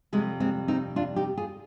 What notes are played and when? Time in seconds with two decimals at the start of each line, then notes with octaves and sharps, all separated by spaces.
0.13 F2 C3 G3 G#3
0.40 G#3 C4
0.68 C4 D#4
0.96 D4 F4
1.16 D#4 G4
1.37 F4 G#4